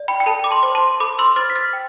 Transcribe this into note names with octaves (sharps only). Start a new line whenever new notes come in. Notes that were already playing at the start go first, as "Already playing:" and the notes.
Already playing: D5
G5 B5
G5
A4 A5
D6
A5 C6
C5
A5 C6
A4 B5 D6
C6 E6
C5 F6 A6
B6
F6 A6
G5